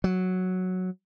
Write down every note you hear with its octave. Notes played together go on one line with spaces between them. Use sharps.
F#3